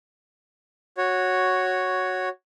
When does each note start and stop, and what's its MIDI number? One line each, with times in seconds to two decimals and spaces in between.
0.97 2.29 66
0.97 2.29 73